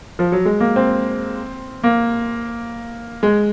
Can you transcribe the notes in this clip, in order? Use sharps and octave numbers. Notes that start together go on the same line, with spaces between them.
F3
F#3
G#3
A#3
C4
A#3
G#3